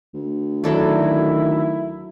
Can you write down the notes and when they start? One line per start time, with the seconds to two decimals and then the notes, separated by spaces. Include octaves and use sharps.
0.14 D2
0.64 D#3 F#3 E4 A4 D5